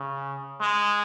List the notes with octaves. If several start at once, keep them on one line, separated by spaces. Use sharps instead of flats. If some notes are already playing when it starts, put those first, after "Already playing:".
Already playing: C#3
G#3